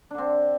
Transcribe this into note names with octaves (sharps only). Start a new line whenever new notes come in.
D3 C4 D4